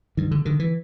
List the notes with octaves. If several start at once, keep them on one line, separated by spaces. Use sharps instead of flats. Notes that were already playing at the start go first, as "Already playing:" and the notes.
G2 D#3
D3
D3 D#3
E3